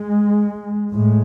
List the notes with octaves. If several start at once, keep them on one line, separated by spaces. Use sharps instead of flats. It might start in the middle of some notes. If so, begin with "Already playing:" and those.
Already playing: G#3
A2 G#3